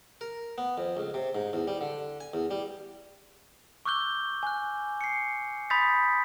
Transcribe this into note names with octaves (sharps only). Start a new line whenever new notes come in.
A#4
B3
F2
C#2
C3
G#2
E2
G3
D3
G#5
E2
G3
C#6 D6 E6 F#6 G6 G7
G#5 F#6
C7 C#7
B5 C6 D#6 G6 A6 B6